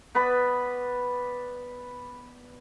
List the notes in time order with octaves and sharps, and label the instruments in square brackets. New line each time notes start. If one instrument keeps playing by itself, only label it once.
[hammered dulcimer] B3 B4 D5 B5